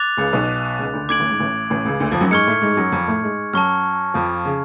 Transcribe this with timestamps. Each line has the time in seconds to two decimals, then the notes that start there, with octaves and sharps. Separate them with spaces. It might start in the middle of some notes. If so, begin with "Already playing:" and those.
Already playing: D6 F#6 A6 F7
0.17 C#2 C#3
0.33 B1 B2
0.78 C#2 C#3
0.93 D2 D3
1.09 D2 D3 D6 G#6 D7 F#7
1.19 A1 A2
1.29 G#2
1.39 A1 A2
1.70 A1 A2
1.85 C#2 C#3
2.00 D2 D3
2.12 F2 F3
2.21 F#2 F#3
2.31 G#2 G#3 C#6 F6 G#6 C#7
2.47 A2 A3
2.61 G#2 G#3
2.73 G#3
2.77 F#2 F#3
2.92 F2 F3
3.07 A2 A3
3.23 G#2 G#3
3.53 F#2 F#3 A5 C#6 F6
4.14 F2 F3
4.45 C#3